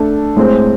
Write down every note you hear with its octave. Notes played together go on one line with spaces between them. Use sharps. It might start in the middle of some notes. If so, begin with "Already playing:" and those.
Already playing: A3 D4 A4
A2 G#3 C4